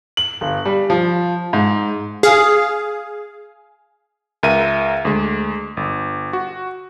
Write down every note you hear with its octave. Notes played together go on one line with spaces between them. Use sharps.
F#7
G1
G3
F3
G#2
G#4 F5
C#2 A#4 E5 D#7
D2 G#3
G1
F#4